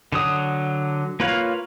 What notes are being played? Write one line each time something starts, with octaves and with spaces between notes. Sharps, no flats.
D3 F#3 D#6
A#3 F4 B4 C#5 F5